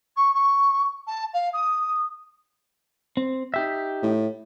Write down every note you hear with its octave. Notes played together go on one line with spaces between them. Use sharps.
C#6
C#6
A5
F5
D#6
C4
D#4 G4 E5
A2